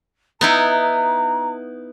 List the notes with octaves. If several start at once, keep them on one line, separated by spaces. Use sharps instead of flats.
B3 D#4 E4 A#5